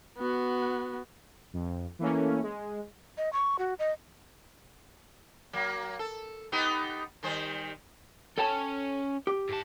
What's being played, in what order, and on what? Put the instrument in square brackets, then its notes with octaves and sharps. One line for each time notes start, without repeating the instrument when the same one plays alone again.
[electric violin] B3 F#4
[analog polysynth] F2
E3 A3 A#3 C#4
G#3
[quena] D#5
C#6
F#4
D#5
[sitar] F#3 A#3
A4
B3 D#4 G4
D#3 G3 C5
[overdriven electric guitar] C#4 [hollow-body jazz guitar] A4 G5 A5
[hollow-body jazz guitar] G4
[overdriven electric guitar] G#2 A5